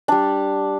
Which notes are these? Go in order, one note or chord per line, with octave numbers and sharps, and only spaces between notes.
G3 D4 A5